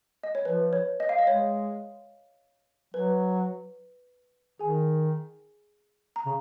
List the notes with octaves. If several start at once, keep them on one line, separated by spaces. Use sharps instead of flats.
D#5
C#5
F3 B4
C#5
D#5
F5
D#5
G#3 C#5
F#3 B4
D#3 G#4 G#5
A#5
C#3